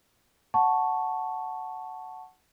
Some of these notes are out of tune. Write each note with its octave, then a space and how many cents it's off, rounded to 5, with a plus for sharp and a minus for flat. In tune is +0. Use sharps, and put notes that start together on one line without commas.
F#5 +0 A5 +0 C#6 +0